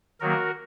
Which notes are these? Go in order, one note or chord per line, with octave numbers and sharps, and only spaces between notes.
D#3 F#3 A#3 F#4 A#4